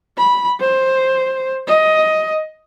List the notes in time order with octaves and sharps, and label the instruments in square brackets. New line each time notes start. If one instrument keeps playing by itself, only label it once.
[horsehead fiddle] B5
C5
D#5